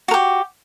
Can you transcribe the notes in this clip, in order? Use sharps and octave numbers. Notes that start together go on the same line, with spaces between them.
F#4 G4 A#4